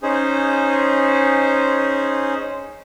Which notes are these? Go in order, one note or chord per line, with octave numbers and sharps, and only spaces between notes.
C#4 D#4 G#4 C5